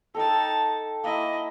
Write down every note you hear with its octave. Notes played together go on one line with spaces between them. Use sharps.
D#4 A4 G5 A5
A#3 E4 D#5